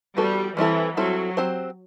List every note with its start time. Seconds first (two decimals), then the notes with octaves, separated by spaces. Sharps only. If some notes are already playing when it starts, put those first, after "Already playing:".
0.17 E3 G3 B3 F#4 A4
0.57 E3 G3 C4 E4 A4
0.97 F#3 G3 C4 E4 A4
1.37 F#3 C4 G4 C5